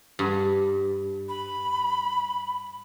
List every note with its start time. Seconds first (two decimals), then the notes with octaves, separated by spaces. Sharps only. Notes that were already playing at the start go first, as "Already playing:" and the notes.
0.19 G2
1.29 B5